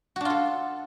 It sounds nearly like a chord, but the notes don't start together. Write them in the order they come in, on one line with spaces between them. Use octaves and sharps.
F#4 D4 F4 A4